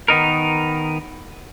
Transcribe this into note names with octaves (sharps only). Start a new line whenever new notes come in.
D#3 B3 D#4 A#4